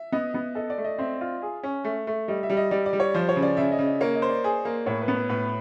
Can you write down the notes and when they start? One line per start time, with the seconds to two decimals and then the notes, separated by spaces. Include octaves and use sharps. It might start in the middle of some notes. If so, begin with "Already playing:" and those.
Already playing: E5
0.12 B3 D#5
0.34 B3
0.55 A4 D#5
0.70 D5
0.78 A3
0.85 D#5
0.98 C4 E5
1.21 F4
1.42 G#4
1.63 C#4
1.84 A3
2.07 A3
2.28 G3 D#5
2.43 E5
2.50 G3
2.57 D#5
2.71 G3 D5
2.86 D5
2.93 G3
3.00 C#5
3.14 F3 C5
3.29 C#5
3.36 C#3
3.43 D5
3.57 C#3 E5
3.72 D#5
3.79 C#3
3.87 D#5
4.01 A#3 C#5
4.15 D#5
4.22 C5
4.29 D5
4.44 G#4
4.65 A#3
4.86 A2 C#5
5.02 B4
5.08 B3
5.15 B4
5.29 A2 B4